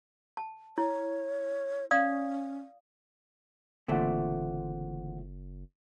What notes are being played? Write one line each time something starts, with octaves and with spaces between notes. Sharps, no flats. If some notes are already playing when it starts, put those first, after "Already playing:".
A5
E4 C#5
C#4 D5 F5 D#6
F#1 A#2 D3 E3 A3 C4 F#5